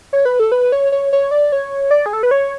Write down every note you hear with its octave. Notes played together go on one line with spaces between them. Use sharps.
C#5
B4
A4
B4
C#5
C#5
C#5
D5
C#5
D5
G#4
A4
B4
C#5